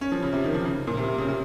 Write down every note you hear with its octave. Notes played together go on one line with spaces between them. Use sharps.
C#4
F3
C#3
C3
D#3
F3
C#3
A#2
C3
C3
C#3
C3